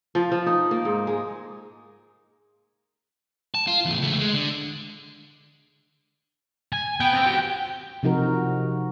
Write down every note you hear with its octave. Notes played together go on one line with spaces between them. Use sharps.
F3
F3
D#4
A#3
G#2
G#3
A5
F4
E2 A2
C#2 A3
G#3
D3
G#5
B3 G5
B3 C4
F#4 G4
C3 F3 D#4 F#4 A#4